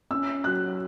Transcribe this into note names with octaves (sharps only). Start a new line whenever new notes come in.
C#4 E6
F#3 F#6